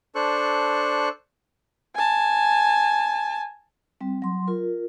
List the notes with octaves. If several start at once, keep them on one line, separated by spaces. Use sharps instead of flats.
D4 A4 C5 C#6 F#6
G#5 A5
G3 C4
F#3 C6
F4 A#4